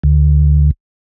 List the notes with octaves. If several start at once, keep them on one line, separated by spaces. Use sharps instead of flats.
D2